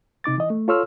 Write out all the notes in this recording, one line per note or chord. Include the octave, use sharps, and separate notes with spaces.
C3 D#4 D6 A6
E3 D#5
A3
F4 A4 C#5 C6 E6 F6